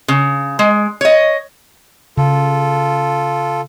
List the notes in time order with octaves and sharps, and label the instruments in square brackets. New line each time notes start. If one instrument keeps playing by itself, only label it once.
[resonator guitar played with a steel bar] C#3
G#3
C#5 D#5
[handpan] C#3 [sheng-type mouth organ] F4 A4